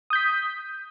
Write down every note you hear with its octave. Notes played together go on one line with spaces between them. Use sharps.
D#6 G6 B6